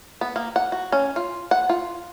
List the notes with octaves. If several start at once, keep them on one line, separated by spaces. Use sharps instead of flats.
B3
A#3
F#5
F#4
C#4
F4
F#5
F4